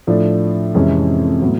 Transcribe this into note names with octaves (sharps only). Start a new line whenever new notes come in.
A2 F3 A3 D4
F2 C3 E3 G#3 C#4
A2 F#3 B3